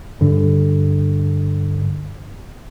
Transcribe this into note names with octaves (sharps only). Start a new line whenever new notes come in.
G2 D3